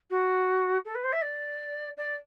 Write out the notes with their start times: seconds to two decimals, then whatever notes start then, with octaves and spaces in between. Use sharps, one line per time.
0.10 F#4
0.85 A4
0.95 B4
1.04 C5
1.12 E5
1.22 D5
1.97 D5